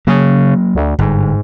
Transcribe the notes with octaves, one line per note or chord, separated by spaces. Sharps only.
C#3 F#3 A#3
D2
G1 G#2